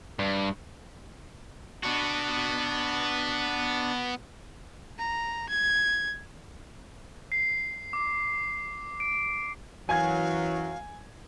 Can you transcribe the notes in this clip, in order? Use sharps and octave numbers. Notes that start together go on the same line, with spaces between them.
G2
B3 D4 F#4
A#5
G#6
C7
D6
D7
F#2 E3 F#3 F5 G#5 G#6